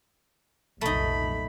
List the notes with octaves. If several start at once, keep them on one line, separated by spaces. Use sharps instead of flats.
F1 B1 A#2 A3 D#4 B5